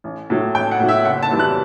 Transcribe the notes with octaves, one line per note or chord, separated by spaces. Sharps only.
A1
A2 F#3
A1 G5
F#5
A2 F#3
E5
F#1 F#5
A5
F#2 E3 G3
F#6